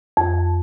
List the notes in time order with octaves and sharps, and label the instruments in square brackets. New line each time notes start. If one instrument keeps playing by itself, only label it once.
[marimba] F2